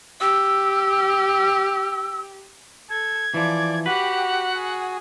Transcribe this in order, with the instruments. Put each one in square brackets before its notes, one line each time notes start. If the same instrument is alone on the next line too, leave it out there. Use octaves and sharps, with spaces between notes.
[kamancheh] G4 [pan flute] E6
[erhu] A4 [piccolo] G#6
[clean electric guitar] E3 F3 [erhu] D5
[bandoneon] F#4 [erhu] G4 [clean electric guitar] B4 [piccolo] F#5
[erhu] G#4